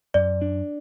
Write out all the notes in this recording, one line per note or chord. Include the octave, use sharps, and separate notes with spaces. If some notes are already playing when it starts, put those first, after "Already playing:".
F#2 D5
D4